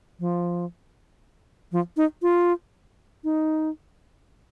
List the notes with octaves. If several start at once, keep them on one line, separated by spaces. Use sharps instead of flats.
F3
F3
D#4
F4
D#4